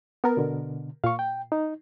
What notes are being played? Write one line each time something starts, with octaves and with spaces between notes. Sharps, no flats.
B3 A#4
B2 D3
A#2 F5 C#6
G5
D#4